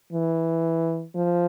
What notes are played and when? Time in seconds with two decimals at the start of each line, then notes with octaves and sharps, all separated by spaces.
0.13 E3
1.15 F3